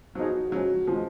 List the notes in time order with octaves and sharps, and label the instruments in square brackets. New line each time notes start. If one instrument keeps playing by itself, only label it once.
[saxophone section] F3 B3 D#4 G#4 [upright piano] F#3
[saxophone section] C#3 F3 G#3 C#4 [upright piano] F#3
[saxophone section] C#3 G#3 [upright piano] F3